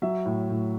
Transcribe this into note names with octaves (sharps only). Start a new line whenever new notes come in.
F#3 E5
A2
A2